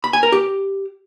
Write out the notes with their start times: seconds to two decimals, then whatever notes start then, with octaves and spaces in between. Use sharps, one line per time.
0.04 B5
0.13 G#5
0.23 A#4
0.32 G4